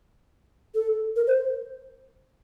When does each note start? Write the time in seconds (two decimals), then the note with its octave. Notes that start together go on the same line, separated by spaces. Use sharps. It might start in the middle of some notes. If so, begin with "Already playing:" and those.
0.75 A4
1.16 A#4
1.27 C5